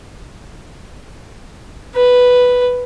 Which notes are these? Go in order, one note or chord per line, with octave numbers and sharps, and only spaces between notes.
B4